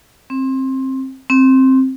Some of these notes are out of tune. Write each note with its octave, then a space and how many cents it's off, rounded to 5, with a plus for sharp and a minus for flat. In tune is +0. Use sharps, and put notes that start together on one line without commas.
C4 +20
C4 +10